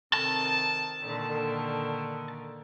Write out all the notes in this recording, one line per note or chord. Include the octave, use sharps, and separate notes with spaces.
C3 D#3 A4 A5
A#2 D3 D#3